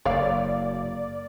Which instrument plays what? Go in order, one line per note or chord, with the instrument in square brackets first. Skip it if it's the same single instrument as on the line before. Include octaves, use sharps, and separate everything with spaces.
[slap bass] F#1 [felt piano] A#3 [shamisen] C#5 F5 [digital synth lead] D5